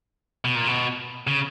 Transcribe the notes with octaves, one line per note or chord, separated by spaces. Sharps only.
B2
A#2
B2
C#3